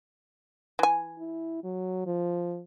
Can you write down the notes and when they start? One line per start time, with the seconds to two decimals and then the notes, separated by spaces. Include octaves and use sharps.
0.79 E3 G#5
1.19 E4
1.63 F#3
2.06 F3